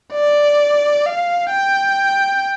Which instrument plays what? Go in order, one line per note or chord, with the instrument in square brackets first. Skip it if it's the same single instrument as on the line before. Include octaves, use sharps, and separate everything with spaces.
[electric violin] D5
F5
G5